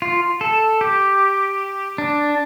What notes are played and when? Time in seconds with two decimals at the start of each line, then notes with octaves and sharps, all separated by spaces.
0.02 F4
0.41 A4
0.81 G4
1.98 D4